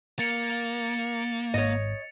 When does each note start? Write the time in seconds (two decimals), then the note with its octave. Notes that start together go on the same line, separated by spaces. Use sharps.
0.19 A#3 A6 C#7 F7
1.54 G#1 G#2 C#5 D#5